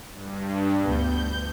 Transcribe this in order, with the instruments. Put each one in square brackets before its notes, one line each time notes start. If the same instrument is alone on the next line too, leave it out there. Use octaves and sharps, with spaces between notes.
[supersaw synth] G2
[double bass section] D2 B3 [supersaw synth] G6